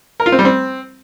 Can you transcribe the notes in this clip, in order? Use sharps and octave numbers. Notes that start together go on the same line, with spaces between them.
A#4
F4
C4
G3
C4